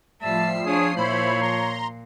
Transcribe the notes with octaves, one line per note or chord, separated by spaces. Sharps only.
A2 F3 G3 E5 A5 E6 C7
D4 F4 G#4 C#5 D#6
A#2 E4 C5 C#5 B5
A#5 C6